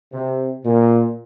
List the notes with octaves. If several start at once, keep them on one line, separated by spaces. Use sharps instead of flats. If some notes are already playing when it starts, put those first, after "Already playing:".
C3
A#2